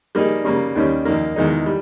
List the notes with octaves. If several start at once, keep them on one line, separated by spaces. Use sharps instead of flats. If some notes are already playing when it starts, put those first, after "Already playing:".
G3 A#3 D#4 G#4
C#3 G3 A#3
D#2 D#3 G3 C#4
D#2 D#3 A#3
E2 D#3 G#3 D#4
G3